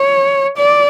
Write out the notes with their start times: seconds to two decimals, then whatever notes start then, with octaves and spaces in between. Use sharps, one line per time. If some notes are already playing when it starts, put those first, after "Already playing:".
Already playing: C#5
0.58 D5